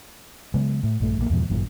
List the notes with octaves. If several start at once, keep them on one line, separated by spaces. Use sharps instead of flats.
C#3 F#3 G#3 B3
A2
A#1 G2 A3
A#1 G2 A#3
E2 G#2 B2 F3
G#1 F#2 A#2